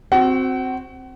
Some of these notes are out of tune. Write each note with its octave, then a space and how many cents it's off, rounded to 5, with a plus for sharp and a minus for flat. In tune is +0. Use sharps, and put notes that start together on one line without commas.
C4 +0 F#4 -10 F#5 +35